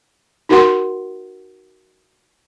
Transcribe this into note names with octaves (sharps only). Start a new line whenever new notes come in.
D#4 F#4 A#4 F#5 C6